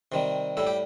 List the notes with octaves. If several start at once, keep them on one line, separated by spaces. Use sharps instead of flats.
C3 D#3 G3
A2 G3 A4
G4